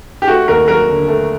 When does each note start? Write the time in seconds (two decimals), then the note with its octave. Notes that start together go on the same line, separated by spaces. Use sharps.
0.22 G4
0.28 A3 F#4
0.48 D#2 A#4
0.68 F#3 A#4
0.88 D3
1.08 A3